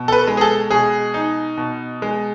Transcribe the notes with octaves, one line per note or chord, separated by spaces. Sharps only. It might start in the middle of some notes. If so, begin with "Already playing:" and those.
Already playing: B2
A4
B4
G#3
G#4
A4
B2 G#4
D#4
B2
G#3